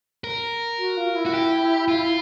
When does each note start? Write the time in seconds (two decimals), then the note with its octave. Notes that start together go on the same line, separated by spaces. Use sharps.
0.24 A#4
0.79 F#4
0.97 F4
1.15 E4
1.26 F#4
1.34 G4
1.88 F4